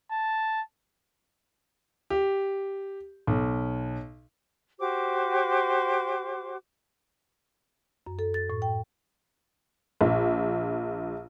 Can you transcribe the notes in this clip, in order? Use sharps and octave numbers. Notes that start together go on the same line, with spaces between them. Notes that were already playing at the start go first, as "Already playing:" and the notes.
A5
G4
B1
F#4 G4 C5 D6
F#2
A4
A6
A2
G5
A#1